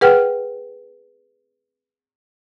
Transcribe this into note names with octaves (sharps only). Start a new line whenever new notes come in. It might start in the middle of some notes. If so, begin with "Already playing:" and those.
G#4 B4 F#5 G5 F6